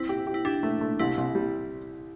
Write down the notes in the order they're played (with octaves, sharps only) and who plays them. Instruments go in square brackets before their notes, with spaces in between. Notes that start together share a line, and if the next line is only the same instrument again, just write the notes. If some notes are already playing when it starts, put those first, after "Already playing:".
Already playing: [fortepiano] C4 [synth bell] E4
[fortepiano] G4
G4
[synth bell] E4
[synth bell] D4 [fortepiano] G4
[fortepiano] A3
A3
[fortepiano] C2 [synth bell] E4
[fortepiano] C2
G3